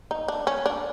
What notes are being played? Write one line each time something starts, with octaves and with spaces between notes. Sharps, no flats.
D#4
D4
C#4
D4